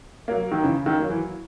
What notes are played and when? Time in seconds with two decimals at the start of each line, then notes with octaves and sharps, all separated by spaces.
0.28 F#3 A#3
0.52 D#3
0.63 C#3 E3
0.86 D#3
0.99 F#3 A#3
1.10 E3